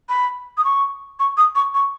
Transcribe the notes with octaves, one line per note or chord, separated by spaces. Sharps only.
B5
D#6
C#6
C#6
D#6
C#6
C#6